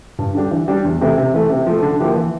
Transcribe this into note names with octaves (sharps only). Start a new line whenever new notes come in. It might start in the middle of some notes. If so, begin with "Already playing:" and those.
G2
D3 G3 D4 G4
E3
G3 D4 G4
E2
C3 E3 A3 E4
C3
E3 A3
C3
F3 A3
D3
F3 A#3 E4 G4
E3